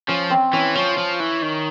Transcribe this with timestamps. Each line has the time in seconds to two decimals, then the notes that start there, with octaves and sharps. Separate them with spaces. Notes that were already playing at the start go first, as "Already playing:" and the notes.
0.08 F3 C#4
0.30 C4
0.53 E3 C#4
0.75 F3 C#4
0.97 F3
1.20 E3
1.42 D#3